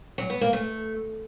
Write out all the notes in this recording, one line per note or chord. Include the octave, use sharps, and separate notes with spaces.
F#3
B3
A#3
A3